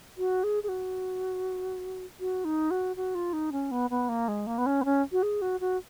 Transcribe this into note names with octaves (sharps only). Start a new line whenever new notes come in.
F#4
G#4
G#4
F#4
F#4
D#4
F#4
F#4
F4
D#4
C#4
B3
B3
A#3
G#3
A#3
B3
C#4
B3
C#4
F#4
G#4
F#4
F#4